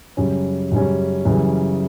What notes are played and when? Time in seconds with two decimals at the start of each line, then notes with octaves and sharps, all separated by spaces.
0.17 F#2 C#3 G3 C#4
0.72 F#2 C#3 G3 C#4
1.25 F#2 C#3 E3 G3